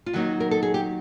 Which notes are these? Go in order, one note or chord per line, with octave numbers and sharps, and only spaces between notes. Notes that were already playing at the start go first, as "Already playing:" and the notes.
F4
D#3 F#3 A#3 D#4 F#4
A#4
A4
G#4
G4